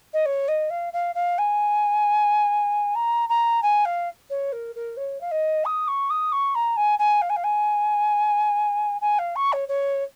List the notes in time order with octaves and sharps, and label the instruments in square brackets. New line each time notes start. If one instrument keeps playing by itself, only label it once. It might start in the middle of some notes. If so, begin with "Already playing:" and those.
[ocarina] D#5
C#5
D#5
F5
F5
F5
G#5
A#5
A#5
G#5
F5
C#5
A#4
A#4
C#5
F5
D#5
D#6
C#6
D#6
C#6
A#5
G#5
G#5
F5
G#5
F5
G#5
G#5
F5
C#6
C#5
C#5